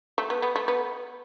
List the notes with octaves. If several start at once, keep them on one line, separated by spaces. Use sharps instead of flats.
A3
B3
B3
A3
B3